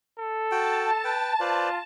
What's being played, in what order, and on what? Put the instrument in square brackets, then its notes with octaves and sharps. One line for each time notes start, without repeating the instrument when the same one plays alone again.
[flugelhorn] A4
[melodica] F#4 G5 [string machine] A5
[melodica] B4 G5
[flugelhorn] F4 [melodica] B4 C5 D5